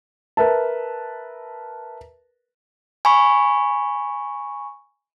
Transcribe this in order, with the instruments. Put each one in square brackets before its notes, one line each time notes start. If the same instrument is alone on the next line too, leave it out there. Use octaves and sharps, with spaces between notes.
[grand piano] A#4 B4 E5 A5
[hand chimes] G#5 B5 C#6